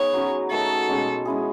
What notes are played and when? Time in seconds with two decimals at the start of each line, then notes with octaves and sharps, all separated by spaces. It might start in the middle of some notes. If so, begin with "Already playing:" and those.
Already playing: B3 D#4 G#4 C#5
0.14 F#3 C#4 F#4
0.51 D#3 F#3 A3 A4
0.89 B2 G#3 C#4 G#4
1.25 G#3 C#4 E4 G#4